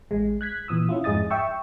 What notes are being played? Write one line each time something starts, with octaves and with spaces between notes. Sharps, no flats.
A1 G#3
F#6 G#6 B6
A#2 E3 D#6 E6
C#4 E4 F4
F2 G#2 G#4 D#5 D#6 A6
E5 G5 C#6 E6